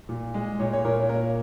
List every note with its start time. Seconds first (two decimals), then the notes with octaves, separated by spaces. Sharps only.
0.09 A#2
0.34 G#3
0.59 A#2 C#5
0.73 C#5
0.85 A#2 A#4
1.00 C#5
1.09 A#3 A#4